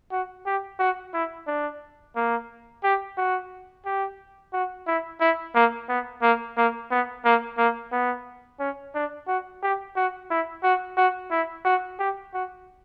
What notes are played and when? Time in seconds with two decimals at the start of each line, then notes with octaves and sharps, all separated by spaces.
0.12 F#4
0.46 G4
0.80 F#4
1.14 E4
1.47 D4
2.16 A#3
2.84 G4
3.18 F#4
3.85 G4
4.53 F#4
4.87 E4
5.21 E4
5.55 A#3
5.89 B3
6.22 A#3
6.57 A#3
6.91 B3
7.25 A#3
7.58 A#3
7.92 B3
8.60 C#4
8.95 D4
9.28 F#4
9.63 G4
9.96 F#4
10.30 E4
10.63 F#4
10.97 F#4
11.31 E4
11.65 F#4
11.99 G4
12.34 F#4